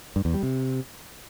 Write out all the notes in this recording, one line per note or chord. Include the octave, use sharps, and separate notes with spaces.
G2
E2
G3
C3